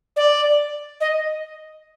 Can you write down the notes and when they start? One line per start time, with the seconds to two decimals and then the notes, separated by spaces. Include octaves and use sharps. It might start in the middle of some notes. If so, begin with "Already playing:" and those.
0.16 D5
1.01 D#5